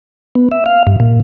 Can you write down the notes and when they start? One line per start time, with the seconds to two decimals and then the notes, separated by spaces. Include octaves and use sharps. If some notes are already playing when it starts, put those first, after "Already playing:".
0.35 B3
0.52 E5
0.66 F5
0.87 G2
1.00 A#2